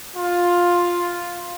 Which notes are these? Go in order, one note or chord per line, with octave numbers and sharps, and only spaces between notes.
F4